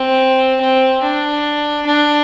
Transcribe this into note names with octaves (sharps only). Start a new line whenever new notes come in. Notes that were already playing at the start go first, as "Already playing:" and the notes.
Already playing: C4
C4
D4
D4